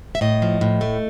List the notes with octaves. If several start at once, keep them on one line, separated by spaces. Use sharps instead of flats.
E5
A2 D#5
F3
A2
A3